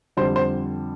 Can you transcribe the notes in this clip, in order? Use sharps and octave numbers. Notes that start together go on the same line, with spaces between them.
F2 D3 G3 C5
C5